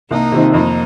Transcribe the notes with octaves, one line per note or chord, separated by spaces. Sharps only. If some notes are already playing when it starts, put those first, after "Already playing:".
C2 A#3 D#4
C3 D#3 C4
F2 A#3 D#4